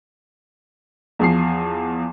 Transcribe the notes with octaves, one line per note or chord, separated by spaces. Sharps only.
E2 F3 C7